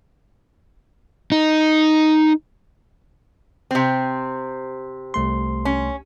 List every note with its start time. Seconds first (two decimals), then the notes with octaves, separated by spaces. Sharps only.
1.32 D#4
3.71 C3 C4
5.14 C2 A3 C6
5.65 C#4